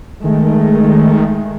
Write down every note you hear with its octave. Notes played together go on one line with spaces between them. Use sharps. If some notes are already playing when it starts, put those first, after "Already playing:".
D#3 G#3 A3